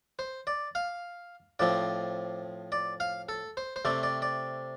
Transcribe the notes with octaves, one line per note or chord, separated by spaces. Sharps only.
C5
D5
F5
A2 F3 C4 D5
D5
F5
A4
C5
C5
C3 A3 C4 D5
D5
D5